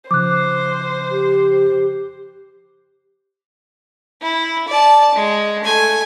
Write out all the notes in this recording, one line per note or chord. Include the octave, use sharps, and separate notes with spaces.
C#3 F3 C5 D6 F#6
G4
E4
D5 A5
G#3
A3 G#5